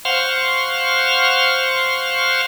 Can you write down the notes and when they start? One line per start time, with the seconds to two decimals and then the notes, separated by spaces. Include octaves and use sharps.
0.05 C5 F5 F#5 C6 C#6 F6